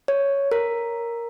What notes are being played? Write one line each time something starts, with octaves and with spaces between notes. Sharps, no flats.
C#5
A#4